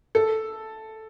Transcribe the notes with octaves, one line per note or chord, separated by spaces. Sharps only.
A4